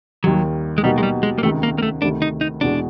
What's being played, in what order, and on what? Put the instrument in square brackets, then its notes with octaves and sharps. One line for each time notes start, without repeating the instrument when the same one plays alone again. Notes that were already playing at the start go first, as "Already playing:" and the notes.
[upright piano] D#2 D#3 G3 [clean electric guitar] F#3
[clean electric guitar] G#3
[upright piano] B2 F#3 A#3 D#4 G4 [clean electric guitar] G3
[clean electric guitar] G#3
G3
G#3
A#3
[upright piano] C#2 C3 D#3 [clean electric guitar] A3
[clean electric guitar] A#3
A#3
A3
[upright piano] D2 C3 D#3 [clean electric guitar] D4
[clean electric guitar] D#4
D#4
[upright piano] E2 B2 G#3 [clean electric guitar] D4